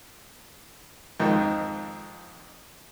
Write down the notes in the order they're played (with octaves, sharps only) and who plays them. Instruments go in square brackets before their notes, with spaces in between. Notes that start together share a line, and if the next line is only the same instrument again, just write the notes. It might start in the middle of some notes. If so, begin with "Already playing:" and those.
[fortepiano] F2 G#2 D#3